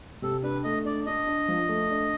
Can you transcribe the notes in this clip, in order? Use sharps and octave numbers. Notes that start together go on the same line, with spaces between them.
C3 A4
D4 B4
A3 D#5
D4 D5
D4 D#5
D4
F3
A3
D4